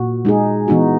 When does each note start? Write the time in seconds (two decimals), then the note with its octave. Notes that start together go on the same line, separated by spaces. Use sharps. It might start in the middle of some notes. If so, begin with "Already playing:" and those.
Already playing: A#2 F#4
0.25 G#3 D#4 G#4
0.68 E3 B3 D#4 F#4